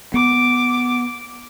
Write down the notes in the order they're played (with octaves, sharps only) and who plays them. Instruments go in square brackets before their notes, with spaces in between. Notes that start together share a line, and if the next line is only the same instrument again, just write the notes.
[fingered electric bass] B3 [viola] D6